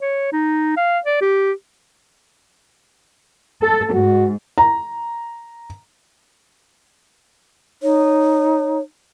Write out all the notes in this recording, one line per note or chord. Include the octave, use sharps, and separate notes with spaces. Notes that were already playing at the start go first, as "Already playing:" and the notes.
C#5
D#4
F5
D5
G4
A4
G#2 F#4
A#5
D#4 C#5